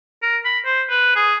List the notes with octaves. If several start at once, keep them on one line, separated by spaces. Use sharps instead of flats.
A#4
B5
C5
B4
G#4